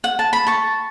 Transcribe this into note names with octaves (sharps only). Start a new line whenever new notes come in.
F#5
A5
B5
A5 C#6